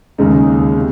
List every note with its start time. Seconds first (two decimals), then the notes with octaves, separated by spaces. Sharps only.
0.18 D#2 C#3 G#3 D#4
0.77 C3